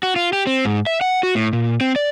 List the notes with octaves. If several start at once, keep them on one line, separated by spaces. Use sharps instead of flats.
F#4
F4
G4
C4
G#2
E5
F#5
F#4
A2
A#2
C4
D5